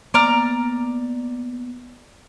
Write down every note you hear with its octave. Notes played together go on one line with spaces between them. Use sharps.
A#3 B3 D5 A#5 F6